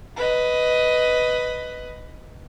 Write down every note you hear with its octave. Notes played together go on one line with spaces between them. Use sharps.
B4 D#5